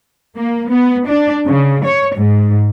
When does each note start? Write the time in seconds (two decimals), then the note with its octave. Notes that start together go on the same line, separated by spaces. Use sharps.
0.36 A#3
0.70 B3
1.06 D4
1.45 C#3
1.84 C#5
2.16 G#2